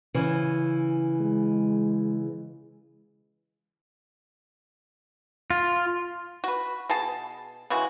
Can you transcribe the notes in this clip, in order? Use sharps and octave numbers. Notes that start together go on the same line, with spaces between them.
C#3 E3
G#3
F4
F#4 B4
B2 G#4 A5
C#3 E3 G#3 F#4